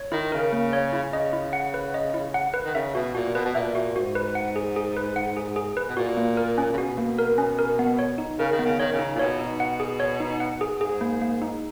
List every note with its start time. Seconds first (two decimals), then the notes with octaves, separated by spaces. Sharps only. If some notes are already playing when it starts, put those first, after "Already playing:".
Already playing: C#5
0.12 D#3 E4
0.32 C#3 A#4
0.53 A#3
0.73 C#5
0.93 E4
1.13 C#3 D#5
1.33 E4
1.53 F#5
1.74 B4
1.94 D#5
2.14 E4
2.34 F#5
2.54 B4
2.65 D#3
2.75 C#3 E5
2.94 B2 F#4
3.15 A#2 F#4
3.35 B2 B4
3.45 B2
3.55 A#2 E5
3.75 F#4
3.95 G#2 F#4
4.15 B4
4.35 F#5
4.56 G#4
4.76 G#4
4.97 B4
5.16 F#5
5.37 G#4
5.56 G#4
5.77 B4
5.89 B2
5.97 A#2 F#4
6.17 A#3
6.37 A#4
6.58 C#4
6.73 C#3
6.77 B2 F#4
6.98 A#3
7.19 A#4
7.38 C#4
7.59 A#4
7.79 B3
7.99 C#5
8.18 D#4
8.39 C#3 A#4
8.52 D#3
8.59 B3
8.65 C#3
8.79 D#3 C#5
8.93 C#3
8.99 D#4
9.16 A#2
9.19 B2 C#5
9.39 D#4
9.60 F#5
9.80 G#4
10.00 C#5
10.20 D#4
10.40 F#5
10.61 G#4
10.80 G#2 G#4
11.01 A#3
11.21 A#3
11.42 D#4